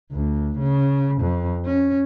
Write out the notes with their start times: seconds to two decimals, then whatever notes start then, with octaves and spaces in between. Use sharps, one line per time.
0.13 D2
0.59 C#3
1.22 F2
1.66 C#4